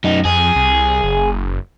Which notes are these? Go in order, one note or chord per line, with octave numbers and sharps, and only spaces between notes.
F#2 D#4
F2 G#4
C2
F#1